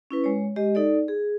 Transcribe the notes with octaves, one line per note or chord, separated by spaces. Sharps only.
C#4 E4 B4
G#3 C#5
G#3 G4 D#5
D#4 A4 D5
G#4